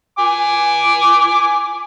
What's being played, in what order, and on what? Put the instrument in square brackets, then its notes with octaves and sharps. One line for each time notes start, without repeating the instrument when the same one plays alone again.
[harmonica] G#5 D6